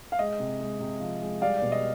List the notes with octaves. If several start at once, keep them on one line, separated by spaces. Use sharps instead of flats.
F5
G#3 D#5
C3
G#3
C3
F3
G#3
G3 D5 F5
D5
B2
D#5